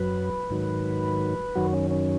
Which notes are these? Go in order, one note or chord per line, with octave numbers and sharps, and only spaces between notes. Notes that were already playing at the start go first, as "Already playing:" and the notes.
Already playing: F#2 F#3 B4
G#2 D#3 F#3
F#2 D#3 F#3 F#4
C#4
C#4